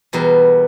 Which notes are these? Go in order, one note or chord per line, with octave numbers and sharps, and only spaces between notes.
E2 B2 G3 A#4